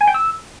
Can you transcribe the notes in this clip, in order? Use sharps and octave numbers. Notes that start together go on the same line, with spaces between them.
G#5
G5
E6